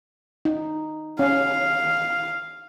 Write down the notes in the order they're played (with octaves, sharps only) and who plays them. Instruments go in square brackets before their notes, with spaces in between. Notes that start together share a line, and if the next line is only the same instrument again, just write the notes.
[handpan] D#4
[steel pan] C#4 [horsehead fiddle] F5